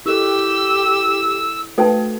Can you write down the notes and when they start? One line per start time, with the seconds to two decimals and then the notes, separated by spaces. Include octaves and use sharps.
0.06 E4 G4 A4 E6
1.78 A3 F#4 A4 B4 G5 A5